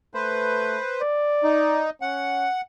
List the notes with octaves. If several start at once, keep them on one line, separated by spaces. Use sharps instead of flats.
A3 B4 C5
D5
D#4
C#4 F#5